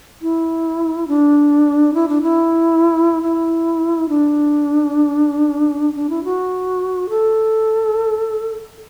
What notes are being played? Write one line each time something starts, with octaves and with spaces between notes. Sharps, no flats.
E4
D4
E4
D4
E4
E4
D4
D4
E4
F#4
A4